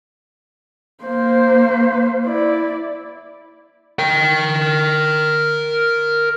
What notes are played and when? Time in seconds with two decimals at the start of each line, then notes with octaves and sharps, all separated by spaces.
1.04 A#3 C5
2.25 E4 D5
3.99 A#4 G5